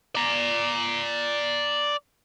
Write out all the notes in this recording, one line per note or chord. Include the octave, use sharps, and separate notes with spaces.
D5 A#5